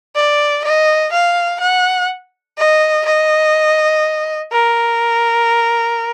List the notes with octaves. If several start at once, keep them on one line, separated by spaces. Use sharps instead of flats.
D5
D#5
F5
F#5
D#5
D#5
A#4